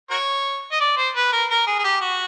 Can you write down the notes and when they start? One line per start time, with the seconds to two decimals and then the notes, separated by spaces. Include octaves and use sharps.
0.10 F#4 A#4 C#5
0.72 D#5
0.80 D5
0.97 C5
1.16 B4
1.33 A#4
1.50 A#4
1.67 G#4
1.79 G#4
1.84 G4
2.01 F#4